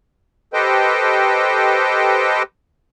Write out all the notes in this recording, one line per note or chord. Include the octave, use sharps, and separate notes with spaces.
G4 A4 B4 C5 D#5 G5